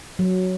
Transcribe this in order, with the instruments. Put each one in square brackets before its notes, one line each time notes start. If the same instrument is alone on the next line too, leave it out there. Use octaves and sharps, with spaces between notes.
[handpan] F#3